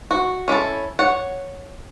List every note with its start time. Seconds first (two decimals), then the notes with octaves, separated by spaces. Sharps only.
0.11 F#4
0.48 C#4 E4 F4 A4
0.99 C#5 F#5